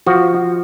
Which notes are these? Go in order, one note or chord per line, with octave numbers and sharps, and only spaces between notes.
F3 F#4